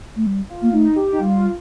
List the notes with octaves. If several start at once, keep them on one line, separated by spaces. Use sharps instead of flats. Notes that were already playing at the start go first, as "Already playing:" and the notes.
A3
G3
F4
A#3
A3 D#4
G4
D#4
G3 F4